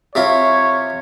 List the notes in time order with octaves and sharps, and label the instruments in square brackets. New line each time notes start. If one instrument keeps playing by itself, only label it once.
[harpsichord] C3 E4 F4 [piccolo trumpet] C#5